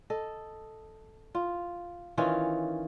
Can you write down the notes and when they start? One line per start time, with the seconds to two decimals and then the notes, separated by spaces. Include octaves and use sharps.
0.10 A4 D#5
1.35 F4
2.18 D#3 E3 C#4 F4